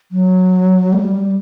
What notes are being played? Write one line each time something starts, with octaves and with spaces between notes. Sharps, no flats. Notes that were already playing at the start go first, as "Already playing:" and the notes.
F#3
A3
G3